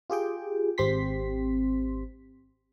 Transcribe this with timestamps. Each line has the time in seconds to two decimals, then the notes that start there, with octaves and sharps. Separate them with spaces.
0.10 F4 G4 G#4 G5
0.78 G#1 C4 G4 C6 B6